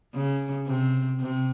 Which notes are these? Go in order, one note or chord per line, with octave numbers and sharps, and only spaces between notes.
C#3
C3
C3